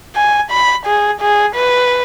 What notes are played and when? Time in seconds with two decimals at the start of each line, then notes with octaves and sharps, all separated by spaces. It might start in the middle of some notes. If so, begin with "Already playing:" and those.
0.16 G#5
0.51 B5
0.86 G#4
1.21 G#4
1.55 B4